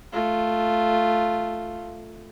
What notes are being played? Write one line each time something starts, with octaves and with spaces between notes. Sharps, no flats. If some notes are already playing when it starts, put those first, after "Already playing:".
A3 F4